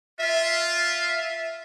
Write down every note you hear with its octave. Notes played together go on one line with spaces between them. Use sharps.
F4 E5